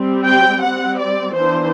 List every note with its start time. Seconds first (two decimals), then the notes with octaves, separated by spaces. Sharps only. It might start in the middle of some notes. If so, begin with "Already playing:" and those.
Already playing: G3 C4
0.26 G5
0.63 G3 C4 F#5
1.00 D5
1.36 E3 B3 D4 C5